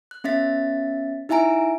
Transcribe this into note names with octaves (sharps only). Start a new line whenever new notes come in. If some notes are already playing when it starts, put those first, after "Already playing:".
F#6
B3 C#4 E5 A6 B6
D#4 E4 E5 G#5 A#5 D7